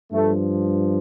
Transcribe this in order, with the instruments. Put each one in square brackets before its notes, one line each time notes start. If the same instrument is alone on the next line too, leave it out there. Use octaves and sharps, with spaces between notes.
[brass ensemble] G2 F3 A3